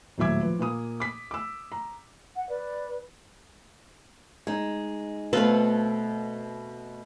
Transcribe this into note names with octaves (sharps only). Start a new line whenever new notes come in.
D#1 A2 F#3 E5 D6 G#6
F3 B4
A#2 A#3 D#6
D6 B6
D6 E6
A#5
F#5
B4 D5
G#3 D#4
B2 A3 C4 A4 B4 F5